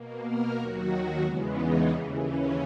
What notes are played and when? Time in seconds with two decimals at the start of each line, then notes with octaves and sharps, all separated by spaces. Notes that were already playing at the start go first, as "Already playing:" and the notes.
Already playing: B2 A#3
0.25 A#4
0.57 D#2 D#3 F#3 F#4
1.23 E2 C#3 E3 G#3 B3
1.55 D#4
1.88 D#2 C#3 E3
2.20 C#4